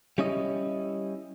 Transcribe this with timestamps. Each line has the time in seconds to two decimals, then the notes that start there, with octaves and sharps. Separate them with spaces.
0.18 G3 C#4 E4 D#5